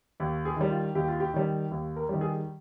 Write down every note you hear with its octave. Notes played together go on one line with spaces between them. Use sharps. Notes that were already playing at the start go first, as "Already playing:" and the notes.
D#2
G#4
D#3 G3
F4
D#2 G4
F4
G4
D#3 G3
D#2
A#4
D#3 G3
G#4